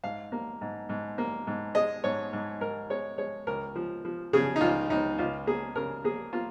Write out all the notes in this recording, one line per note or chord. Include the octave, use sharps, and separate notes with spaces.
G#2 F5
A#3
G#2
G#2
A#3
G#2
G#3 D#5
G#2 C#5
G#2
G#2 A#4
G#3 C#5
G#3 C#5
C#2 A#4
F3
F3
C#3 G#4
D#4
C#2 F4
C#2 D#4
C#2 F4
A#3 G#4
C#3 A#4
A#3 G#4
A#3 F4